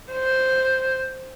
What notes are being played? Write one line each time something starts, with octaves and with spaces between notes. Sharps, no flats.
C5